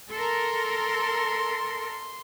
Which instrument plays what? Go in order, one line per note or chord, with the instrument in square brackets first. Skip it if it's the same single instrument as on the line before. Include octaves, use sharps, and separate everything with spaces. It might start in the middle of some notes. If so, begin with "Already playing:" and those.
[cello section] A4 A#4 [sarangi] C6